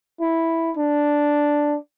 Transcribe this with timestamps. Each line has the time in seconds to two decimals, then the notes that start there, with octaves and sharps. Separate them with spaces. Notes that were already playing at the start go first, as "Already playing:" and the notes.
0.21 E4
0.77 D4